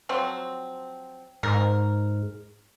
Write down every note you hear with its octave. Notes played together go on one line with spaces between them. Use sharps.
F3 F#3 C4
G#2 A#4